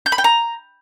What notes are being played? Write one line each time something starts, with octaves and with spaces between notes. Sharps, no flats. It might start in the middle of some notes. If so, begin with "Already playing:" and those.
G6
B5
G5
A#5